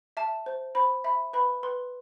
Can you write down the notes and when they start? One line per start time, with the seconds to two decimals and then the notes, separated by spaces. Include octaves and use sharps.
0.17 E5 A5
0.46 C5
0.75 C5 B5
1.04 E5 B5
1.33 B4 B5
1.63 B4 C6